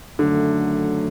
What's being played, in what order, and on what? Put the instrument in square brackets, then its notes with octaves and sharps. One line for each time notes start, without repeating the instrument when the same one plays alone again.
[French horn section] F#2 D#3 F#3 A3 [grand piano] D3